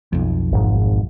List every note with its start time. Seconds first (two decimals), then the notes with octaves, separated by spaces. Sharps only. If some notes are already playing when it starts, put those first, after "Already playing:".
0.13 B1 F2
0.52 G#1 G#2